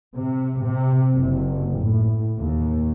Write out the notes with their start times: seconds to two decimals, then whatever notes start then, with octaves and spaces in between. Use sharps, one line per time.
0.15 C3
0.63 C3
1.13 F#1
1.78 A2
2.40 D#2